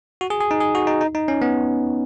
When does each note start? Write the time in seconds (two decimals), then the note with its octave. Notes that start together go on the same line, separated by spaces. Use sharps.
0.21 F#4
0.30 G#4
0.40 G#4
0.51 D#4
0.60 G#4
0.75 F#4
0.87 D#4
1.01 D#4
1.15 D#4
1.28 C#4
1.42 B3